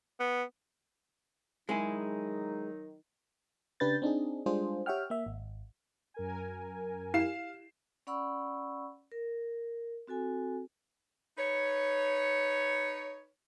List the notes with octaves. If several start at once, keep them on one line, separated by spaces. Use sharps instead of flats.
B3
D#3 F#3 G#3 D#4 E4 G#4
C#3 D4 G4 B4 G6 A6
C4 D4 D#4 G#4
G3 G#3 D4 F4 G#4 C5
G4 C#5 E5 F#5 G5 F6
A#3 E5
G#1
F#2 A#4 G#5
E4 G4 F5 C7 E7
C#4 D5 F#5 B5 C#6 E6
A#4
C4 F#4 A4 G#5
D#4 B4 C#5